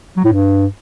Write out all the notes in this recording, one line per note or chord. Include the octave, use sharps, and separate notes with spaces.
F#3
A2
G2